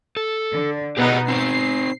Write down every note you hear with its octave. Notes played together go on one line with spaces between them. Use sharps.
A4
D3
B2 B3 D#4 G4 G#4 B4
C4 D#4 C5 C7